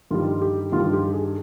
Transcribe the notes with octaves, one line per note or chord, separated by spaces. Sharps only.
G2 D#3 G3 F4
G4
G2 D#3 G3 F4
G4
G#4